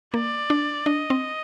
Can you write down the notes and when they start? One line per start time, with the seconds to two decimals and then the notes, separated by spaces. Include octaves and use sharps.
0.14 A#3 D5
0.50 D4
0.86 D4 D#5
1.10 C4